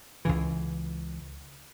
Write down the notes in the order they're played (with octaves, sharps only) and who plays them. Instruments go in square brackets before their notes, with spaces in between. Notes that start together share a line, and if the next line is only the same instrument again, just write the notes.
[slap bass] C#2 C#3 E3